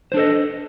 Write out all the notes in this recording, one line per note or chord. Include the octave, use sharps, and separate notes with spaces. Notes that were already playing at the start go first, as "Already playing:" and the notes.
D4 A4 B4 C5 D#5